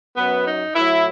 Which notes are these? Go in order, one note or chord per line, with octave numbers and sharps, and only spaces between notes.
F#2 F#3 B3
D#4
A2 F#3 E4